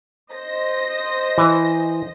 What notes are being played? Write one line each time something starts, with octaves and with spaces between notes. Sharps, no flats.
C5 D#5 A#6
E3